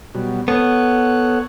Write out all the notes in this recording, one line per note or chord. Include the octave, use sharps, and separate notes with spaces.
B2 F#3 G3
B3 A4 C#5 F#5